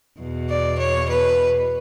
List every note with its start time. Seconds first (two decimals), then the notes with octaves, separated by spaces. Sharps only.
0.18 E2 B2
0.48 D5
0.78 C#5
1.08 B4